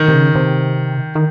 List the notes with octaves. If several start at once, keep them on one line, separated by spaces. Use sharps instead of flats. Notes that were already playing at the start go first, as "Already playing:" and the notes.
Already playing: D#3
C3
C#3
C3
D#3